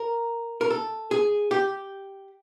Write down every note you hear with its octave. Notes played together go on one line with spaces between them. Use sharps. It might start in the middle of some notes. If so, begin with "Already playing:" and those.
Already playing: A#4
A#4
A4
G#4
G4